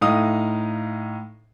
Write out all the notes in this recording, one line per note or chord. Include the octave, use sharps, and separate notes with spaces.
A2 D#4 F5 D#6